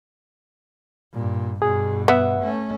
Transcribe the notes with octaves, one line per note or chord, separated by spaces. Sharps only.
G2 A#2
G2 B2 G#4
B3 B4 E5 F#5
A3 C#4